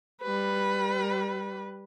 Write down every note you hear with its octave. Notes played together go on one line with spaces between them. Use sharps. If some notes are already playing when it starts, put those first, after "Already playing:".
G3 B4